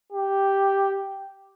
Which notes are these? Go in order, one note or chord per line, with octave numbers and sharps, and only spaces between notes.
G4